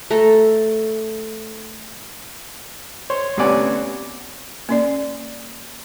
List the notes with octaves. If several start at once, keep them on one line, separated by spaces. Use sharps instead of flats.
A3 A4 A#5
C5 C#5 C6
D2 C3 B3 C#4 D5 G#5
A#3 C#4 D5